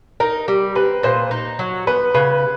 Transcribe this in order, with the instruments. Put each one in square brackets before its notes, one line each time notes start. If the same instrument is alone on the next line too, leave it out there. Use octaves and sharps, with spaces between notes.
[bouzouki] D#4 [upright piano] A#4
[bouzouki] G3
[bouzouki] C4 [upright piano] B4
[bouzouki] A#2 [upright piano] C5
[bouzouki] D#4
F#3
[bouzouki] B3 [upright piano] B4
[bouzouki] C#3 [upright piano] B4